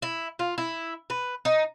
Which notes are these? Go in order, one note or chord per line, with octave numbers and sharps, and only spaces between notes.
E4
F4
E4
B4
D#4